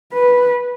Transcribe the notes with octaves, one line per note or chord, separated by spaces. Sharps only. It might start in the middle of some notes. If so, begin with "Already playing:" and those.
B4